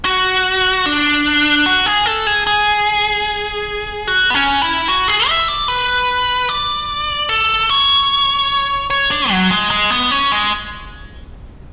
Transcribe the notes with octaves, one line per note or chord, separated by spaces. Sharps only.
F#4
D4
F#4
G#4
A4
G#4
G#4
F#4
B3
C#4
E4
F#4
G#4
E5
D5
B4
D5
A4
C#5
C#5
D4
F#3
G#3
G#3
B3
C#4
G#3